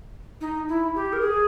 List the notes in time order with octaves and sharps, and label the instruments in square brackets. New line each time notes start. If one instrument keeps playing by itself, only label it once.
[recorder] D#4
E4
G4
A#4
G#4